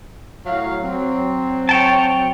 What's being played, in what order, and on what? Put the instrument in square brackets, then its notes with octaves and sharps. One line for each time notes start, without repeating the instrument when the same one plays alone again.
[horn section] A2 F#3 F5
F#3 C4
[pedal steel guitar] C#5 G5 A5